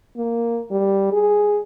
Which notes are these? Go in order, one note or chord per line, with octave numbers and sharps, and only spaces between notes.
A#3
G3
G#4